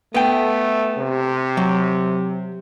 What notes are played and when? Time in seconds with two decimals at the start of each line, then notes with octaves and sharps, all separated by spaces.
0.14 A3 B3 G5
0.99 C3
1.57 F#3